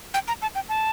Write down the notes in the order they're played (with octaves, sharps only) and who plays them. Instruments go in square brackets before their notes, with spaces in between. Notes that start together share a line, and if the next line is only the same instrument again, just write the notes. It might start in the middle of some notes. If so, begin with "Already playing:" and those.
[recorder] G5
A#5
A5
G5
A5